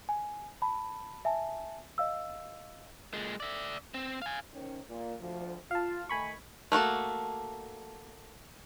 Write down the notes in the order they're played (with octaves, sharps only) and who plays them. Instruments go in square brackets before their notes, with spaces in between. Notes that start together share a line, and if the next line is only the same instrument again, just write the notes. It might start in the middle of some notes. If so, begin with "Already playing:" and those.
[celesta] G#5
A5 B5
E5 G#5 A5
D#5 F5 E6
[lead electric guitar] A#2 G#3
D5 E5
C4
F5 G#5
[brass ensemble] D#3 C4 C#4
A#2
D2 F3
[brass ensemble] F4 [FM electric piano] F5 A5
[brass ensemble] D#3 A3 D#5 [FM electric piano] G#5 B5 C#6
[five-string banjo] A3 A#3 F#4 A4